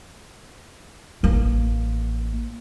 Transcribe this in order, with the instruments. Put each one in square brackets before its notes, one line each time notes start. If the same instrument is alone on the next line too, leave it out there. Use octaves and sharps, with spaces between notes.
[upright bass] A1 A#3